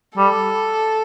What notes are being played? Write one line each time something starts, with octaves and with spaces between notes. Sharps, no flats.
G3 A4